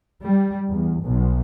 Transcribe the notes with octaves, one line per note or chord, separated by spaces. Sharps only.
G3
E2
B1